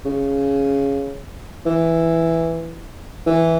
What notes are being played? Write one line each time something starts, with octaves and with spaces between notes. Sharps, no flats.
C#3
E3
E3